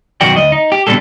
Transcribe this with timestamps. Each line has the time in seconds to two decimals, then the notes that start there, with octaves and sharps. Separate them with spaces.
0.21 B1 F#2 D#3 F#4 D5 G5
0.36 D2 D#5
0.52 D#4
0.72 G4
0.87 B2 D3 D#3 G3 G#3 A4